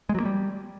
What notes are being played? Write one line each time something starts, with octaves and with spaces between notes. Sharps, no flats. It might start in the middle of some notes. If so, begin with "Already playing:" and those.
G#3
F#3
A#3
G3